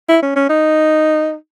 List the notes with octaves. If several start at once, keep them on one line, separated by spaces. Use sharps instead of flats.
E4
C#4
C#4
D#4